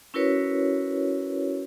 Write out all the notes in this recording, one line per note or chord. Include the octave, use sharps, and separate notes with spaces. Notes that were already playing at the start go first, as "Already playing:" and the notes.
C#4 E4 F#4 A#4 B4 C#5